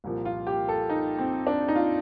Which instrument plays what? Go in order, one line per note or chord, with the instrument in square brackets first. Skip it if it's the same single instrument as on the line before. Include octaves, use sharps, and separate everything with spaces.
[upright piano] C2 A#2 F3
F4
G4
A4
D#4
C4
D4
D#4
F4